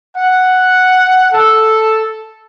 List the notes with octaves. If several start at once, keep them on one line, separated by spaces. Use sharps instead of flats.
F#5
A4